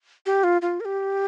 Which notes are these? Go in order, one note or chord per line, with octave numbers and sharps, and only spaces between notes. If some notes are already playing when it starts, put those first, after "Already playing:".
G4
F4
F4
A#4
G4